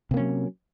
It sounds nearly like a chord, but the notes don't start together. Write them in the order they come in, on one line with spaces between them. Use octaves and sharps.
C3 A#3 C#4 F#3